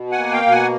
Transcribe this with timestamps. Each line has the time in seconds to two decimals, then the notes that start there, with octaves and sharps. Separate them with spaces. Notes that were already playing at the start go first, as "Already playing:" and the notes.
Already playing: B2
0.11 F#5 G#5
0.18 A#3
0.32 F5 G5
0.46 B2
0.51 F#5 G#5